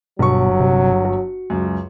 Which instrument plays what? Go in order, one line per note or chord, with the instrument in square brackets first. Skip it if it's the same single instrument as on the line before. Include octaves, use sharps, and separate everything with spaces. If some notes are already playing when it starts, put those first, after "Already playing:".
[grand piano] G1 C#6 [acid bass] B2 [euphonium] F#3
[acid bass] C3
F#4
[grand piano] C#2 F#2